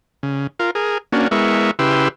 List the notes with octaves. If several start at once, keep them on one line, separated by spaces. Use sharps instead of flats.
C#3
F4 A#4
G#4 A#4
A#3 C#4 D4 F#4
G#3 B3 E4 A#4 E5 C#6
C#3 E4 G4 B4 C6 E6